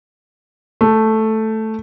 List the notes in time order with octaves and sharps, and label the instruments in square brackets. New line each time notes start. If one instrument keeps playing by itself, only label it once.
[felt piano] A3